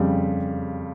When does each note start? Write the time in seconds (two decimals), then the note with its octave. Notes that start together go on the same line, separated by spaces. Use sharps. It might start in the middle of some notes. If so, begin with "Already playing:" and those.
Already playing: F2 C#3 G3